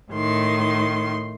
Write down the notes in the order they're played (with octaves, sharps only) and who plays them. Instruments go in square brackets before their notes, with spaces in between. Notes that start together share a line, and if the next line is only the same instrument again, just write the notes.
[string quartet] A2 D#3 C6